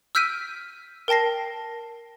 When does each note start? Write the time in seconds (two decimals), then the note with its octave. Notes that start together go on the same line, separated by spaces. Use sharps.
0.15 E6 F6 G6 B6 D7 D#7
1.08 A#4 G5 A5 A#6 C7